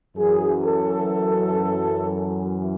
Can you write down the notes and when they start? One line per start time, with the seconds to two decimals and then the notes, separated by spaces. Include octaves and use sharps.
0.16 F#2 E3 G#4
0.63 A4